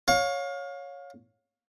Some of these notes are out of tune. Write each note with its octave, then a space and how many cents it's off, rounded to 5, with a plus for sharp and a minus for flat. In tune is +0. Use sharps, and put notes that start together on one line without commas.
C#5 +0 F5 +30